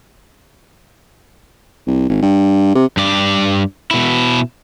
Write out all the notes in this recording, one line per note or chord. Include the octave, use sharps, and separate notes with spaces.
C2
G#1
G2
C3
G2 D5
B2 E4